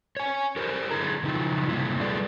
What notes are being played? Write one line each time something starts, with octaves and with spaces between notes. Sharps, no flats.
C#5 G#5
G4 A#4 C5
D3 E4 G#4 A#5
C#3 F3 D#4 E4
C3 G3 A#3 D#4 E4
G3 B3 G#4 A4 B4 D5